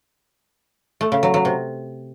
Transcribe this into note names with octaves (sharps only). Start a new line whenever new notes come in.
A3
C#3
F#3
F#3
C3